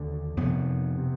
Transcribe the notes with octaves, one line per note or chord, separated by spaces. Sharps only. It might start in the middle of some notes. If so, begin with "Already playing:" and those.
Already playing: D#2 D3
F2 C3 B3
C3